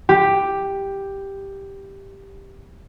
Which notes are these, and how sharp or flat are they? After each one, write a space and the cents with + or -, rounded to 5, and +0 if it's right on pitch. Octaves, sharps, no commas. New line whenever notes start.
G4 +5